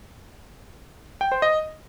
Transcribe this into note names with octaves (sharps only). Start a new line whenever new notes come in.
G5
C5
D#5